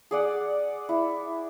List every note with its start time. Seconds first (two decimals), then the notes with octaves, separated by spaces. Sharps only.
0.11 G#4 D5 F#5
0.89 E4